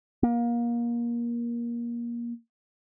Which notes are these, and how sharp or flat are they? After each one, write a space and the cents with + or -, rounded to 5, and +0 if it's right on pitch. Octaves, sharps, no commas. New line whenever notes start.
A#3 +25